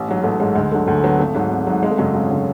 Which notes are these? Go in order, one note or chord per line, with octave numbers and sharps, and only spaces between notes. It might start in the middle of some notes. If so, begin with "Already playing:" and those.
Already playing: A1
G#2 F#3
A1 A3
G#2 F#3 G#3
D2 G#3
D3 F#3 A3
D2 A3
D3 F#3 B3
G#1 A3
G#2 F#3
G#1
G#2 F#3
G#1 G#3
A3
F#2 C#3 F#3 G#3
G#1
C#3 F#3